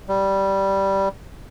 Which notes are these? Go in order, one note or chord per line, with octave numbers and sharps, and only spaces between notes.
G3